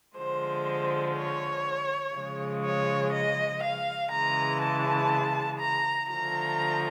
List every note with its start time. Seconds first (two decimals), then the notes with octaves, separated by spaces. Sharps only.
0.17 D3 F3 G#3 C5
1.16 C#5
2.15 C#3 F3 G#3
2.64 C#5
3.13 D#5
3.63 F5
4.12 C#3 E3 G#3 A#5
4.61 A5
5.59 A#5
6.09 D3 F3 A3 A#5